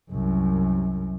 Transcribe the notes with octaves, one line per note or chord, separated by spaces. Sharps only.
C2 F#2